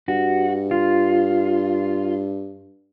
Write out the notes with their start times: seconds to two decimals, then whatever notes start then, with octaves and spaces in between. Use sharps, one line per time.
0.08 G2 F#4
0.71 F4